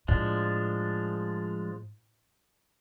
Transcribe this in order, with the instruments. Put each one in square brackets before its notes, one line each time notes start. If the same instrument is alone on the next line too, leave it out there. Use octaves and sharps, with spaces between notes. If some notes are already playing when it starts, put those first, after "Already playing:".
[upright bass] A2 [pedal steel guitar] F3 G#3 D4